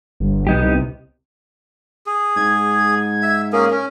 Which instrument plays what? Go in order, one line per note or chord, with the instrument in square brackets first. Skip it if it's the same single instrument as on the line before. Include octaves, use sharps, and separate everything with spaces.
[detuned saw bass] G1
[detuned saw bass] B1 [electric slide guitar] B3 D#4 G4
[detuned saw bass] C2
[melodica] G#4
[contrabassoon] G#2 [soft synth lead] G#6
[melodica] E5
[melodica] A#3 C#4 G#4 [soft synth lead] A#4
[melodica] C#4